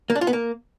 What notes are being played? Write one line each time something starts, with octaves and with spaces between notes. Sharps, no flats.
A#3
D4
F4
B3
A#3